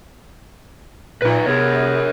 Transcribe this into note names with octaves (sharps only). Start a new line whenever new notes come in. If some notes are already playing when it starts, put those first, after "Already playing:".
A#2 D#4 B4
C3 B3 G#4 A#4 C#5